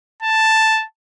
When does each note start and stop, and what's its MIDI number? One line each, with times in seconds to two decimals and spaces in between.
0.23 0.85 81